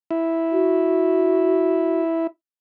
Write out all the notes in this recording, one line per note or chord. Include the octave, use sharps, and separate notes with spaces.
E4
F#4